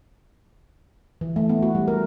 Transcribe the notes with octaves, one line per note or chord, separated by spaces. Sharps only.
E3
A3
B3
F#4
G3
A#4